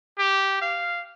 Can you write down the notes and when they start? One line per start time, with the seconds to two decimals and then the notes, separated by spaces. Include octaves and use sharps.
0.18 G4
0.61 F5